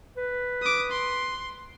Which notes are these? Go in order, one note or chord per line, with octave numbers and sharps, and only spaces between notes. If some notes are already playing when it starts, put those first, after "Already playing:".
B4
D6 D#6
C6